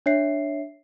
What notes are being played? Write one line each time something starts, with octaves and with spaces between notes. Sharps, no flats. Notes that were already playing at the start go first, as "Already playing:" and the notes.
D4 C#5 E5 C7